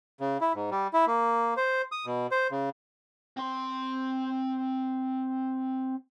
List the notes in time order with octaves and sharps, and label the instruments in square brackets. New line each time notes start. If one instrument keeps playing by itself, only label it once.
[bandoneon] C#3
E4
G#2
G3
E4
A#3
C5
D#6
B2
C5
C#3
[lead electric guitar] C4 C6